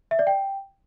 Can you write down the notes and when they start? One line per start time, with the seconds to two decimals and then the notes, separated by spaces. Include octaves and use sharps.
0.11 E5
0.19 D5
0.27 G5